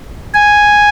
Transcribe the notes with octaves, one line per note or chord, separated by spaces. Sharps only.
G#5